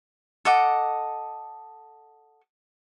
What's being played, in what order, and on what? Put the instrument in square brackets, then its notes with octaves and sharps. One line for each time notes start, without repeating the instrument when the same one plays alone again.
[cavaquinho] A4 D#5 F#5 D6